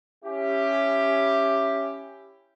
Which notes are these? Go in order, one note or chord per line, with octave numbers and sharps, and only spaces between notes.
C#4 E4 G4